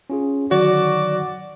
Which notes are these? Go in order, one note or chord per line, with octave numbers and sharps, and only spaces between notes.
C#4 F4 G#4
D3 D#3 F#3 F#4 D5